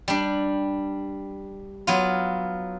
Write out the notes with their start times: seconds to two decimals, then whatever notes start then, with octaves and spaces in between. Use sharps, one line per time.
0.08 G3 D4
1.87 F#3 B3 F4